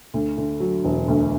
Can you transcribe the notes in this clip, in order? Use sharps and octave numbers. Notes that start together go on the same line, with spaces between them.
D2
D3
F#3
E1
D2